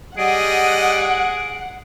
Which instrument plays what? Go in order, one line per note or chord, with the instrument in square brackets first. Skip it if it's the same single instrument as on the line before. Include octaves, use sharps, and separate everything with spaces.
[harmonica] G3 D#5 [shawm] G#4 [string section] F#5 [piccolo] D7